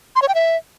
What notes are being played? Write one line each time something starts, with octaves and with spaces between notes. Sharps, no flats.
C6
C#5
G5
E5